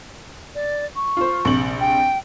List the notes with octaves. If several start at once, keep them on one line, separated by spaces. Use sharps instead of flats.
D5
C#6
F4 C5
A#1 C3 F#7
G5